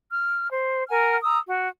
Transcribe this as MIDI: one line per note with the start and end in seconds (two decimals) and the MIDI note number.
0.12 0.49 89
0.50 0.83 72
0.89 1.18 70
0.89 1.18 78
0.89 1.18 80
0.89 1.18 89
1.23 1.39 82
1.23 1.39 87
1.23 1.39 88
1.47 1.68 66